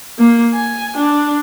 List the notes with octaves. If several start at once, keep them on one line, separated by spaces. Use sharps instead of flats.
A#3
G#5
D4